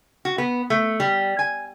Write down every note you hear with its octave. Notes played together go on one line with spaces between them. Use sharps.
F#4
B3
A3
G3
G#5